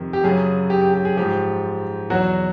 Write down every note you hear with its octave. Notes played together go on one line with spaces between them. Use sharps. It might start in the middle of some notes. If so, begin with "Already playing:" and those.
Already playing: F2 C3 D#3
G4
F#2 C#3 F#3 G#4
G4
G4
G4
G#4
G#2 F3 G4
E2 B2 F#3 F#4